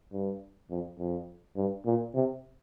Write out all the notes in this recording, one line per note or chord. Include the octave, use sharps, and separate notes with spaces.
G2
F2
F2
G2
A#2
C3